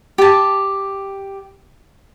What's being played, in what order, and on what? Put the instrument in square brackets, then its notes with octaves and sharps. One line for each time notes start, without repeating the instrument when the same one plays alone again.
[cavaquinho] G4 A5